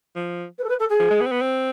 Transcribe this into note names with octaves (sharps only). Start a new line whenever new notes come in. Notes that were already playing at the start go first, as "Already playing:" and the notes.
F3
B4
A4
B4
A4
G#4
F3
G#3
B3
C4
B3
C4